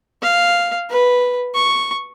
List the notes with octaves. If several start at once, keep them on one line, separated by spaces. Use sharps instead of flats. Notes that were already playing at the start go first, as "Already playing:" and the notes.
F5
B4
C#6